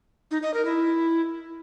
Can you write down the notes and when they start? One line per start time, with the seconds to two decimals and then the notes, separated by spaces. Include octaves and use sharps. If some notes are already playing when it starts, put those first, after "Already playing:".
0.31 D#4
0.42 D#5
0.54 A#4
0.65 E4